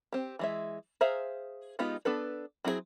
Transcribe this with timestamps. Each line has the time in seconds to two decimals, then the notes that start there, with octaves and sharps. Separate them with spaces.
0.12 C4 G4
0.39 E3 G#3 E5
1.01 G#4 C5 E5 F5 A#5
1.79 G#3 B3 D#4 F4 G4
2.05 B3 D4 A4 B4
2.65 F#3 C4 E4 F4 G#4